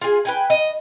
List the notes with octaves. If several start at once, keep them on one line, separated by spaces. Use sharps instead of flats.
F4 G#4
B4 G5 G#5
D#5